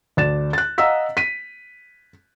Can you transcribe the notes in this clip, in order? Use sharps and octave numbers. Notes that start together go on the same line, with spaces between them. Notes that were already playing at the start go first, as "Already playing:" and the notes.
D2 D5 A6 E7
F#6 A6
D#5 F5 F#5 A#5 E6 B6
B6 D#7